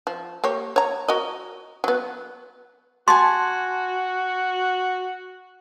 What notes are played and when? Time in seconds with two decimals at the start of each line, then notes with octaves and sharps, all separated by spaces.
0.07 F3
0.44 A#3 G4 C#5
0.76 C#5 A#5
1.08 F#4 A#4 D#5
1.84 F#3 B3
3.08 F#4 G#5 A5 C6